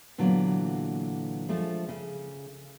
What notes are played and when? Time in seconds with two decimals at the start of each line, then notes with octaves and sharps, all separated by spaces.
0.18 A#2 D3 E3 F#3 A#3 B3
1.49 F3 G#3 A3 D4
1.88 C#3